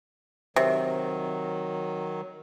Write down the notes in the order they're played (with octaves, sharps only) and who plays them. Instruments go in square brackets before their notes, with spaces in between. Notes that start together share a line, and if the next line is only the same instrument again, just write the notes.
[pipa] C3 [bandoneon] D#3 F#3